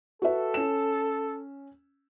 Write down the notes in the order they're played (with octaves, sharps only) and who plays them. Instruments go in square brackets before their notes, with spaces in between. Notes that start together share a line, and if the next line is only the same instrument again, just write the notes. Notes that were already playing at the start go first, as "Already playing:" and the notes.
[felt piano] F#4 B4 E5 [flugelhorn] A4
[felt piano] C#4 E7